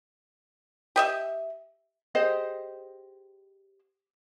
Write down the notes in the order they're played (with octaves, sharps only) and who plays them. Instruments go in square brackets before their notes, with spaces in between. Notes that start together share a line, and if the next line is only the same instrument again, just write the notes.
[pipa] G4 D#5 E5
[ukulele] G4 G#4 C5 D#5